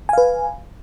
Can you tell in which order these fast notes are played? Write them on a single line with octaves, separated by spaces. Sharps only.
G#5 F5 B4